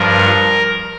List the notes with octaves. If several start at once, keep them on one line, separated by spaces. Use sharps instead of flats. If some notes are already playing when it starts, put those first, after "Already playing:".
Already playing: G2 F3 A#4